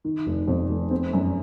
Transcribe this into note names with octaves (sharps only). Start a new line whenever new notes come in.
D#3
F1
F2
F1
C4
F#2